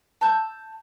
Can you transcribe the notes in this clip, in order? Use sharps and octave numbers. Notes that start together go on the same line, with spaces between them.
A5 E6 G6